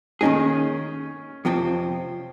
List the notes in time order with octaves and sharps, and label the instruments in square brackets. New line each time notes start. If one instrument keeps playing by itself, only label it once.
[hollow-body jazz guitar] D#3 A#3 D#4 G#4 [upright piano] C#4
[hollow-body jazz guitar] F2 C3 F3 C4